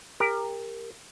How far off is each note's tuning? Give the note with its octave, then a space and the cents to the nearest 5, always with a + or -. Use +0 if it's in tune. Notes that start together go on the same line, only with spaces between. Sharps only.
G4 +25 A#4 +0